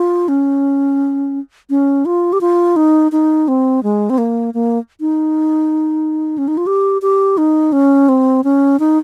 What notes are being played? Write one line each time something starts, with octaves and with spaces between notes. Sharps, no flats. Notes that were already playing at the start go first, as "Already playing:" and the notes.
Already playing: F4
C#4
C#4
F4
G4
F4
D#4
D#4
C4
G#3
C4
A#3
A#3
D#4
C#4
D#4
F4
G4
G4
D#4
C#4
C4
C#4
D#4